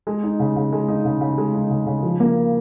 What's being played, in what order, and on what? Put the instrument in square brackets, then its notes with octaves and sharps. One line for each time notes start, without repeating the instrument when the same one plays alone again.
[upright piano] G#3
D#4
C#3
C#3
G#3
D#4
C#3
C#3
G#3
D#4
C#3
C#3
F3
A#3